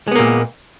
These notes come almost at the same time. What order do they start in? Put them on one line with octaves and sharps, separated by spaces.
G#3 B3 A#3 A#2